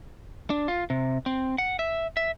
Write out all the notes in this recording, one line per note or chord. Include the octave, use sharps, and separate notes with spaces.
D4
F4
C3
C4
F#5
E5
E5